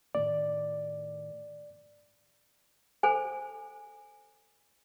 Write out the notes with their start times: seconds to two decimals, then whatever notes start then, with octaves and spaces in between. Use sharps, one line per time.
0.15 A2 D#3 A3 D5
3.03 A4 C5 G#5